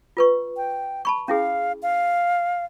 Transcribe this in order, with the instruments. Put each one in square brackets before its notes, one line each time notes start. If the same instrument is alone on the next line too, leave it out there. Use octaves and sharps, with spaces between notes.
[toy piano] F4 B4 C#6
[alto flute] G5
[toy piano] A5 B5 C#6
[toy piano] C#4 E4 G#4 [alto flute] F5
[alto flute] F5